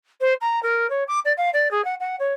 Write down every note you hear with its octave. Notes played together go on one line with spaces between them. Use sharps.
C5
A#5
A#4
C#5
D6
D5
F5
D5
G#4
F#5
F#5
C#5